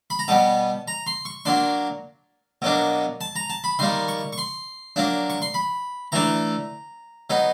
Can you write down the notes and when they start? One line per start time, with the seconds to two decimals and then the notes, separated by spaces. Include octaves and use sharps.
0.10 B5
0.19 A#5
0.28 B2 G3 B3 A5
0.88 A#5
1.07 C6
1.25 C#6
1.45 F#3 A#3 D4 C6
2.62 B2 F#3 A#3 D4
3.21 A5
3.36 A#5
3.50 A5
3.64 B5
3.79 D#3 G3 A#3 C6
4.08 C#6
4.33 C#6
4.38 C6
4.96 F#3 A#3 D4
5.30 C#6
5.42 C6
5.54 B5
6.12 E3 A3 D4 A#5
7.30 F#3 B3 D#4